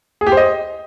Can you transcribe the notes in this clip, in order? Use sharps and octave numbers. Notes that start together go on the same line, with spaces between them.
G#4
G4
C5
D#5